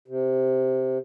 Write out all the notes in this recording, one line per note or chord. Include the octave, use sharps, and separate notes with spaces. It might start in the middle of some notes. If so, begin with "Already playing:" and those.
C3